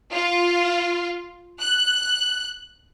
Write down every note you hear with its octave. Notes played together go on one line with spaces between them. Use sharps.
F4
F#6